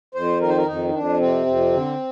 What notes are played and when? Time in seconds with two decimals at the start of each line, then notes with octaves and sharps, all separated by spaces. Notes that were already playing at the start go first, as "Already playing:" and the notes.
0.15 F2 C5
0.41 D#3 A#4
0.49 C5
0.57 A#4
0.67 F2 D#4
0.89 D#4
0.94 F2 D4
1.19 C3 C4
1.46 F2
1.73 D3